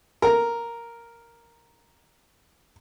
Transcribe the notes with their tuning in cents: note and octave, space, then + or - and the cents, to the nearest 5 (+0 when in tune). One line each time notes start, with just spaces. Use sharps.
A#4 +0